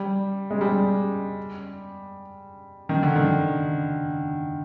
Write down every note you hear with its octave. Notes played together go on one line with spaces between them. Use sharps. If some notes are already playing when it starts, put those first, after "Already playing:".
Already playing: G3
G#3
G3
D#3
D3
D#3